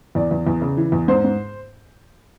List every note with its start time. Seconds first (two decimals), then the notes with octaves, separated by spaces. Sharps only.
0.15 E2 D5
0.31 E2
0.47 E2
0.61 C#3
0.77 E3
0.92 E2
1.08 G#2 C5
1.24 G#2